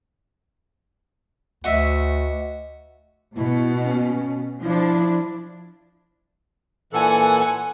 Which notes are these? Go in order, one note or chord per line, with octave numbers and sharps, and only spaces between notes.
D2 F#4 D#5 E5
B2 E4
C#4
F3 D4 E4
A#2 E3 A4 F#5 G#5